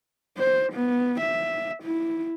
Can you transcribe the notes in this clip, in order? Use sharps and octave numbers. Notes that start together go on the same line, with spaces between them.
C5
B3
E5
E4